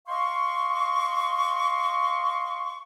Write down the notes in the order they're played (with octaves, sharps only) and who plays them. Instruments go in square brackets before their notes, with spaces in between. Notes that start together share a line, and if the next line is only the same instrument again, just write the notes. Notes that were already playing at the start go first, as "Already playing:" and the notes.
[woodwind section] D#5 F5 C6 C#6